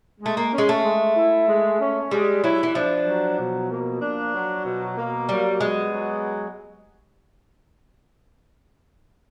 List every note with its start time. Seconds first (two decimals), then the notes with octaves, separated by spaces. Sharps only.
0.21 G#3 A3
0.37 A#3
0.53 G#3 C#4
0.69 A3
0.84 G#3
1.16 E4
1.48 G#3
1.80 C#4
2.11 G3 G#3
2.44 F#3 E4
2.63 E3
2.75 F3 D4
3.06 F#3
3.39 B2
3.70 A#3
4.02 D4
4.34 F#3
4.65 B2
4.97 A#3
5.29 F#3 G3
5.60 G#3 B3
5.92 F#3